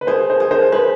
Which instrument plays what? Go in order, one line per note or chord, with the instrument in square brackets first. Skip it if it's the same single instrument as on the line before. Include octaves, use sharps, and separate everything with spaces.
[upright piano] B4
[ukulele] G#4 [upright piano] C5
[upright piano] C5
[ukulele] G#4
[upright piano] C5
[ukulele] B4 [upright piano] C5